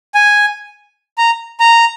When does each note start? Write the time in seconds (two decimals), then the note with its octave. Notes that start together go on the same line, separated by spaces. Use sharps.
0.15 G#5
1.18 A#5
1.60 A#5